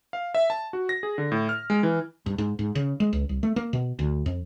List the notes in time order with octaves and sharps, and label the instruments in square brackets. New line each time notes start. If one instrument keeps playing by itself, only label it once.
[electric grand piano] F5
E5
A5
F#4
A#6
G#4
D3
A2
F6
G#3
E3
[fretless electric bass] G2
G#2
G#2
C#3
G#3
C#2
C2
A3
A#3
B2
D2
F2